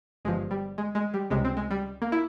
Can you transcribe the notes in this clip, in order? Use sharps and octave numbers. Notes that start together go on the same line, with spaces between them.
G1 G2 F3 G#3
G3
G#3
G#3
G3
C#2 C3 G3 G#3
C4
G#3
G3
A#3
E4